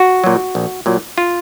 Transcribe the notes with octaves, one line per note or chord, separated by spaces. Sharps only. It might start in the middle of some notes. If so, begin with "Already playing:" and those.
Already playing: F#4
A#2 F#3
A#1
A#2 F#3
F4